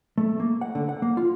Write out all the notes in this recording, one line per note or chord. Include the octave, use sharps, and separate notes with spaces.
A3
A#3
F#5
D3
F#5
A#3
F4